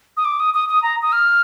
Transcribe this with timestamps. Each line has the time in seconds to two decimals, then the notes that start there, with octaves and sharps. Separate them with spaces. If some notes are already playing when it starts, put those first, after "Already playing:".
0.17 D#6
0.25 D6
0.40 D#6
0.54 D#6
0.69 D#6
0.83 A#5
1.02 D#6
1.12 F6